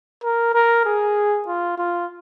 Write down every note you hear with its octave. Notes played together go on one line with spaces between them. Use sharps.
A#4
A#4
G#4
F4
F4